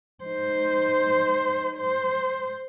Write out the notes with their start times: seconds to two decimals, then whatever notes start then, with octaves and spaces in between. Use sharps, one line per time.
0.24 D#4 C5
1.77 C5